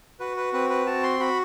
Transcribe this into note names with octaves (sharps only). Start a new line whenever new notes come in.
F#4 B4
B4
C4 B4
B4
F#4 A5
C6
F#4 B5